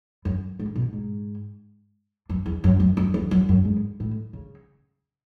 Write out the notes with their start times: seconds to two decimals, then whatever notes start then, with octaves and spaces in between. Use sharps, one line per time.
0.25 F#2
0.59 G#2
0.75 B2
0.93 G#2
2.29 F#2
2.46 E2
2.64 F#2
2.80 F#2
2.97 F#2
3.14 E2
3.31 F#2
3.49 F#2
3.65 G#2
4.00 A2
4.33 C#3